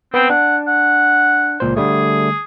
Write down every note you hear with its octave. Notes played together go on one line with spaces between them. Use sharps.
B3 C4 B4 G5
D4 F#5
F#5
C#2 A#2 C5
D3 G3 A3 G#4